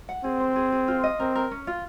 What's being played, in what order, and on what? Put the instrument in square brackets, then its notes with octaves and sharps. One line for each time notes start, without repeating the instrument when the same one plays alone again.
[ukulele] F#5
[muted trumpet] C4 [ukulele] G#4
[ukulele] C5
G#4
G#4
F4
D#5
[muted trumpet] C4 [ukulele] A#4
[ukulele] A#4
C#4
F4